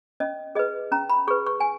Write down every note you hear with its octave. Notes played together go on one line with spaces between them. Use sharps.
C#4 D#5
G#4 B4 D#5
C#4 A#5
B5
G#4 B4 C#6
C#6
G#5